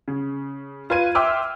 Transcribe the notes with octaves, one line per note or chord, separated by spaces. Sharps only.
C#3
F4 B4 G#6 D#7
E5 G5 C6 D6 E6 F6